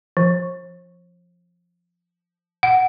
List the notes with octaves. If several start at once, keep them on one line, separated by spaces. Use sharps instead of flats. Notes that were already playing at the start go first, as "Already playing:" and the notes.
F3
F#5